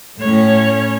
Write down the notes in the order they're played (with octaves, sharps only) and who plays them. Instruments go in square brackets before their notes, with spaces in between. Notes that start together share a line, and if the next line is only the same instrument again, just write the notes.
[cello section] A2 [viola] C#4 C#5